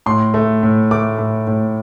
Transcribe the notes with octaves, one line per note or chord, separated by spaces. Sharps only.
A2 C6
A3
A2
A3 D6
A2
A2